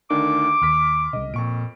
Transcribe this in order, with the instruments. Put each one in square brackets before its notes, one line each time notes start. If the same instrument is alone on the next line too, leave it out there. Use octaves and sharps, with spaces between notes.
[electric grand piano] D2 D#3 D4 [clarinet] D6
[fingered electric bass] D#2 [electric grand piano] C6 F6 B6
[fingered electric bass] C2 C#3 [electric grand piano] D#5
[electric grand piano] F2 C#6 D7 [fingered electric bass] A#2